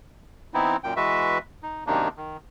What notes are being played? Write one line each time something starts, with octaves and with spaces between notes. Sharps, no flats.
E3 B3 C4 D#4 E4
F#2 A#2 G5
E3 G#3 F#4 B4 E5
D#4
F#2 C3 D#3 A#3 D4 D#4
D#3